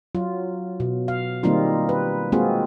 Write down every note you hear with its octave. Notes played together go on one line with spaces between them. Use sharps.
F#3 F4
B2
F5
D#3 G3 A#3 C4 D#4 F4
B4
G#3 A#3 C4 F4 F#4 G#4